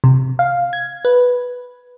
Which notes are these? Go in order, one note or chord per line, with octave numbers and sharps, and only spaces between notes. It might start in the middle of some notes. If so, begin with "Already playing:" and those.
C3
F5
G#6
B4